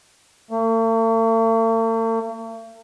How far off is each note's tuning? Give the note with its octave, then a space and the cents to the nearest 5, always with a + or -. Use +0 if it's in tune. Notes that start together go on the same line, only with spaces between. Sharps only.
A3 +45